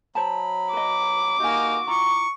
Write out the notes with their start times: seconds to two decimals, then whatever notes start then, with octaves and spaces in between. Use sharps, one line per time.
0.15 F#3 C5 A5 B5
0.73 B4 D#5 D6
1.40 A#3 D#4 F#4 G4 G#5
1.87 E4 F4 A#5 C#6